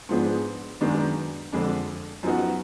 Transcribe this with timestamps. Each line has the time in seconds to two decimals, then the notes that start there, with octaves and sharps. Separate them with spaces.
0.09 G#2 F3 B3 D4 G#4
0.81 F#2 D#3 G#3 B3 D4
1.52 F2 D3 G#3 D4
2.23 F#2 F3 B3 D#4 F#4